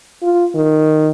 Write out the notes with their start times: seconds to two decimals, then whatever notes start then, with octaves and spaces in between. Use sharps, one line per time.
0.23 F4
0.55 D#3